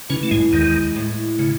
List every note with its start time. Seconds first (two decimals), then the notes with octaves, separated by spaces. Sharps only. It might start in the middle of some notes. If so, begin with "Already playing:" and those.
0.09 C#3 E3 C#4
0.23 A3
0.31 G#2 G#3
0.52 D#2 D#3 G#3
0.96 A2
1.38 A2 C#3